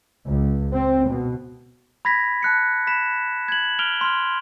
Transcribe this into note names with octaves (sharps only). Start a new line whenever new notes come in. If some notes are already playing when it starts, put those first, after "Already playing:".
C#2
C4
B2
B5 G#6 A#6 B6
A5 F#6 C#7
B5 B6 E7
G#6 F#7
F6 D7 F7 G7
C6 F6